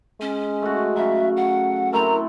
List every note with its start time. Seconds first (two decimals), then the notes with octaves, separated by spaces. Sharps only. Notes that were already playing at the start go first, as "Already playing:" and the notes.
0.21 G#3 C#4
0.62 A3 F#4
0.96 C#3 F#3 E5
1.36 F#5
1.93 A3 C4 E4 A#4 A#5